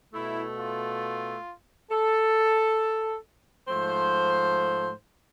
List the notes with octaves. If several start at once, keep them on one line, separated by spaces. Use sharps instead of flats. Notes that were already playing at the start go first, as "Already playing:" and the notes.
B2 A3 E4
F4
A4
G#2 F3 A3 C5